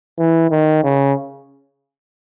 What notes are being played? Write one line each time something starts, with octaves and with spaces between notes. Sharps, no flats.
E3
D#3
C#3